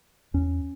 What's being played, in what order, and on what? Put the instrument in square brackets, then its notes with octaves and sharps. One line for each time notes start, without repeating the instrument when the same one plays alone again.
[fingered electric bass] E2 C#4